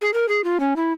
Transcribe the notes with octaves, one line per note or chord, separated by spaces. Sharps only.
G#4
A#4
G#4
F4
C#4
E4